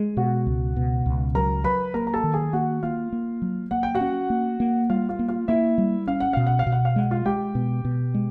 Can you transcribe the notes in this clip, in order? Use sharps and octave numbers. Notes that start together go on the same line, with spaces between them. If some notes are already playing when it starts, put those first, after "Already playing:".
Already playing: G#3
B2 F#4 F#5
C#2
B2
C#2
F#3 A#4 A#5
F#3 B4 B5
A#3 A#4 A#5
A#5
A4 A5
D#3
G#4 G#5
A#3 F#4 F#5
A#3 F4 F5
A#3
F#3
A#3 F#5
G5
F#4 F#5
C#4
A#3
A#3
G3 F4 F5
F4 F5
A#3
F4 F5
A#3 E4 E5
G3
C#4 F5
F#5
B2 F5
F#5
F5
B2
F#5
F5
G#3 F#5
F4 F5
G#3 G4 G5
B2
B2
G#3